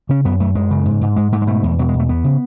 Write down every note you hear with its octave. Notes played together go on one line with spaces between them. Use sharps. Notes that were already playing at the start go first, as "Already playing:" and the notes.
C#3 C#4
F#2 B3
F#2 A3
F#2 G#3
C#3
G#2
G#2
G#2 G#3
G#2 A3
G#3
B2 A3
E2
B2 F#3
G#3
E2
A3
E2 B3
C#3